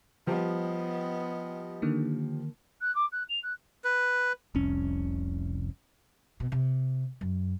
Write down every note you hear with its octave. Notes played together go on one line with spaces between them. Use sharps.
F3 G3 B3 D#5
D3 D#3 A#3
F#6
D6
F#6
F7
F#6
B4
F1 C2 C#4
B2
C3
F#2